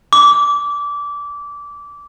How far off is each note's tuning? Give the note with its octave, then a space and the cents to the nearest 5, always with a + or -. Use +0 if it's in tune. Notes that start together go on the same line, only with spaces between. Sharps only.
D6 -20